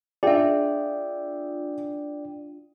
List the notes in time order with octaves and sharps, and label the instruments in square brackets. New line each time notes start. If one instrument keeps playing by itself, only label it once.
[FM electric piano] D4 F4 [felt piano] G#4 E5 [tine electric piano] D5 G5